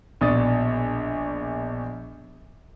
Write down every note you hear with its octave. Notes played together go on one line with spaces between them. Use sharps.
A#1 B2 D4 D#6 A6